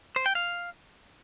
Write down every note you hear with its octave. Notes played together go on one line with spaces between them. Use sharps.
C5
G5
F5